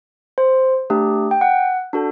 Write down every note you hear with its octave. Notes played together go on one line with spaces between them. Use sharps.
C5
A3 D4 G4
G5
F#5
D4 F#4 A4